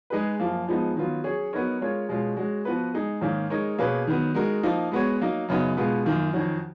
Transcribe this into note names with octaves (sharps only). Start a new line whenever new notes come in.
G#3 D#4 G#4 B4
F#2 F3 A#3
F2 F3 G#3 B3 D#4
D#3 F#3 B3 F4
F#3 C#4 G#4 C#5
F#3 B3 D#4 A#4 C#5
G#3 C#4 F4 A#4 C#5
B2 G#3 C#4 F4
G#3 C#4 F#4
F3 B3 F#4 B4
G#3 D#4 G#4
G#2 D#3 A#3 C#4
G#3 D#4 A#4 C#5
B2 A#3 C#4 G#4 B4
D#3 F#3 B3
G#3 D#4 F#4 A#4
F3 A#3 D#4
G#3 B3 F#4 C#5
F#3 A#3 D#4
F#2 C#3 F#3 B3 D#4
B2 G#3 B3 F4
F#2 D#3 A#3 F4
F2 D#3 F#3 C#4 F#4